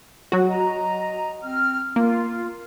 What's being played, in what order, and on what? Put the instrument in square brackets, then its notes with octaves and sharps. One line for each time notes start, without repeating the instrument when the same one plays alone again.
[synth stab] F#3 F#4
[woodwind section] D#5 A#5
C4 F6
[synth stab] A#3 [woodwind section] F4